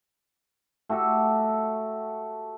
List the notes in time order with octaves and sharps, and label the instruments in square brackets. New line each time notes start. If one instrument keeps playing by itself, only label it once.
[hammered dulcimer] A3 F#4 G4 A4